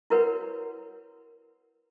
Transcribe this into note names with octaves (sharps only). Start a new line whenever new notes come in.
E4 F#4 A#4 B4 C#5 F#5